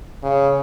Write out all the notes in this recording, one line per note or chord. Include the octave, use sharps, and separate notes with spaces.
C#3